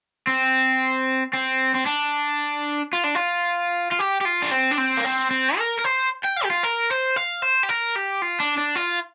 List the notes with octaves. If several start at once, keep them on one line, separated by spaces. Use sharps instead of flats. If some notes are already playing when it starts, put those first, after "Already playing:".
C4
C4
C4
D4
F4
D4
F4
F4
G4
G4
F4
D4
C4
D4
C4
A#3
C4
C4
A#4
A#4
C5
G5
F5
G4
F4
A#4
C5
F5
C5
G4
A#4
G4
F4
D4
D4
F4